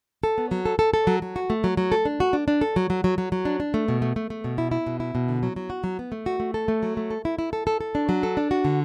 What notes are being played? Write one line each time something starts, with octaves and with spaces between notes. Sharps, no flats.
A4
B3
F#3
A4
A4
A4
F#3
F#3
F#4
A3
F#3
F#3
A4
D4
F#4
D4
D4
A4
F#3
F#3
F#3
F#3
F#3
D4
D4
A3
B2
A3
A3
A3
B2
E4
E4
B2
E4
B2
D3
F#3
F#3
F#4
F#3
B3
A3
F#4
A3
A4
A3
F#3
A3
A4
E4
E4
A4
A4
A4
D4
F#3
A4
D4
F#4
D3